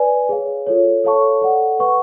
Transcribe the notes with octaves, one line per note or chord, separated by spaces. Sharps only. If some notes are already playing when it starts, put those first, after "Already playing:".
Already playing: B4 D5 G#5
G#4 C#5 F5
F4 A4 C#5
A4 C#5 F5 A5 C#6
A4 D5 F#5
B4 F#5 C#6